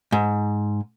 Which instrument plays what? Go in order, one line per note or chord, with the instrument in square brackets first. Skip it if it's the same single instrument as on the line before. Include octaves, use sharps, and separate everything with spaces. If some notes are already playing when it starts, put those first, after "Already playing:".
[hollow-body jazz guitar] G#2